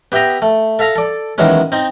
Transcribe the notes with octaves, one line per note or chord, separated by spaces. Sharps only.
B3 G4 E5 G5 A#5 D#6
A3
A4 E5 F5 A#5
A4 D5
D#3 E3 F#3 G#3 B3 C#4
C4 D#4